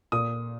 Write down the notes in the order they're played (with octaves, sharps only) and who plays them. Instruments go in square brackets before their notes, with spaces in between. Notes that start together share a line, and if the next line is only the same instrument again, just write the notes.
[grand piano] A#2 D#6